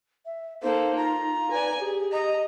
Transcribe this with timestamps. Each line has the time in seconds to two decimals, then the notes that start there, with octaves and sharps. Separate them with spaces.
0.25 E5
0.63 A#3 D#4 A4 C5
0.97 F4 A#5
1.51 B4 D5 G#5
1.80 G4 G#4
2.12 D#5 A#5